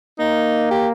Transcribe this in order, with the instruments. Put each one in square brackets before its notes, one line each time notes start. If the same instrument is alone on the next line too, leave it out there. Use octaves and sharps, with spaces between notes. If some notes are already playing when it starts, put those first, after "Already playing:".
[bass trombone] A#3 [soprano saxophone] D#4
[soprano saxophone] G4